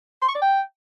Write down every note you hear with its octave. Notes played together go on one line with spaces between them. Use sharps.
C6
C#6
D5
G5